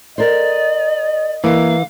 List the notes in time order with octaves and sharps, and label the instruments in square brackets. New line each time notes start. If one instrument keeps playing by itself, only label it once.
[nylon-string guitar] A#4 C5 [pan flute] D5 [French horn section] D#5
[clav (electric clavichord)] E3 [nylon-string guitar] A#3 [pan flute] F5